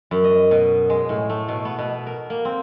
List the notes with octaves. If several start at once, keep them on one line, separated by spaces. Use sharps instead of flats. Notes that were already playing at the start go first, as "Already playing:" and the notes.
F#2
D#5
B2
G#3
A2
A3
B2
B3
B2
A#4
A#3
C4